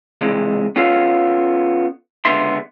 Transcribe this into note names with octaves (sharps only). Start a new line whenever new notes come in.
C#2 C3 E3 G#3
B3 C#4 F4 A4 F5
C#2 D3 B3 G4 E5 C6